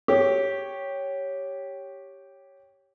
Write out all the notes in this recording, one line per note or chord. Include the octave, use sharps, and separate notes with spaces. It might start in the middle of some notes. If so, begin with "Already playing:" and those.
G4 C#5